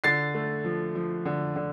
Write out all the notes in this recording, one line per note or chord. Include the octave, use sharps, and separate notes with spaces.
D3 A6 C7
A3
F3
F3
D3
D3